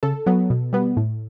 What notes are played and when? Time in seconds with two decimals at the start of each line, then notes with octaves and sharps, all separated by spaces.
0.03 C#3 A4
0.26 F#3 B3
0.50 B2
0.73 G3 B3
0.97 A2